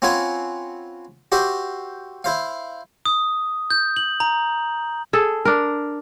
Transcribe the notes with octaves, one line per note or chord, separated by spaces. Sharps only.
C4 C#4 F4 B4 F#5 G#5
F#4 G4 C5 E5
E4 C5 F5
D#6
G6
F#7
A#5
G#4 A4
D4 A#4